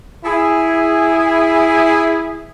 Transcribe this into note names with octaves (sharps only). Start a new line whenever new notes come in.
E4 G#4